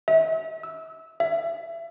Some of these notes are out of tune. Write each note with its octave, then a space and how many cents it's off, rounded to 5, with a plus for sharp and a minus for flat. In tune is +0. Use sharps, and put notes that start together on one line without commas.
E5 -35
E6 -15
E5 +25